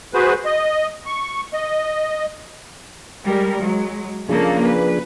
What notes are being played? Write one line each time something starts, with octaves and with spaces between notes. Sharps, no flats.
F#4 G#4 B4 C5
D#5
C#6
D#5
G3 G#3 A#4
F#3 G#3
C#3 F3 A#3 D4 G#4 A4
B4